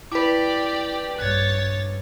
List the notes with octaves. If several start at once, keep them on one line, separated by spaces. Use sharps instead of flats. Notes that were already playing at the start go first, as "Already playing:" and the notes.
E4 G4 B4 D5 D6
A#1 G2 C#5 F#6 G#6 A6